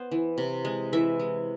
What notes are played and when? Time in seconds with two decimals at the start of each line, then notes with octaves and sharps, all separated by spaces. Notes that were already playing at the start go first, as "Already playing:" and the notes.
Already playing: B3 C5
0.11 E3
0.38 C3
0.65 G#3
0.93 E3 E5
1.20 G#3